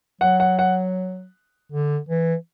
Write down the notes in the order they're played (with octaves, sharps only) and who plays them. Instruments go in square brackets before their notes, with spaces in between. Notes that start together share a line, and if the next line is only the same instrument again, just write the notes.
[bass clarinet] F#3 [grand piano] F#5
[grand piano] F#5
F#5
[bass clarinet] D3
E3